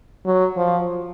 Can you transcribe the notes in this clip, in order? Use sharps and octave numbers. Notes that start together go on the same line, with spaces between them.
F#3
F3